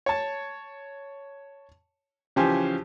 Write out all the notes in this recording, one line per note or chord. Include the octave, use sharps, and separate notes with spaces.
C#5 A5
C#3 E3 F3 G4 C5 G#5